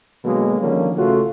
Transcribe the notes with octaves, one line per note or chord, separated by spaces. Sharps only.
B2 D3 F#3 G#3 A#3
D3 D#3 F3 G3 A#3 C#4
A1 C#3 A3 F4 F#4